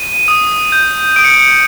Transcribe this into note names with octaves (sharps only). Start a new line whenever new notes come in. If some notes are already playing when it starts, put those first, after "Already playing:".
Already playing: D#7
D#6
G6
D#6 D7
C#7
D7
C#7